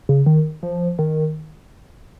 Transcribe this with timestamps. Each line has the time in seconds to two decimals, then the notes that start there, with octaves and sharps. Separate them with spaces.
0.09 C#3
0.26 D#3
0.63 F3
0.99 D#3